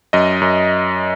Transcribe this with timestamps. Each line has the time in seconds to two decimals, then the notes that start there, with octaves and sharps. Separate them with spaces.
0.13 F#2 D#5
0.42 F#2